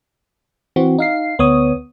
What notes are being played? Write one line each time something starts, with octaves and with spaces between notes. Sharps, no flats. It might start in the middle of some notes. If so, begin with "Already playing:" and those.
E3 C4 F#4
D#4 F5 C7
D2 B3 C#5 D#6